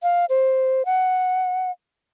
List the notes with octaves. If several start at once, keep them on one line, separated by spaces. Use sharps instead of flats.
F5
C5
F#5